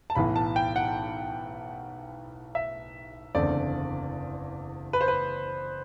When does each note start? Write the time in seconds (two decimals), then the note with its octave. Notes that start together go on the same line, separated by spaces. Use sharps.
0.10 A5
0.15 B1 A2 E3 B3 B5
0.36 A5
0.56 G5
0.76 F#5
2.55 E5
3.35 F#1 E2 D3 A3 C4 D5
4.93 B4
5.01 C5
5.08 B4